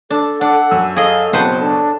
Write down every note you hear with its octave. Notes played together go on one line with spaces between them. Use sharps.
D4 A4
D4 F#5
F#2 E6
G#4 A4 D#5 F5
F#1 B2 C4 B4 C5 F#5 A5
D4 A4